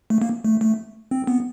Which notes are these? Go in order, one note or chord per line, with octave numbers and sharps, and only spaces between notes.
A3
A#3
A3
A3
C4
B3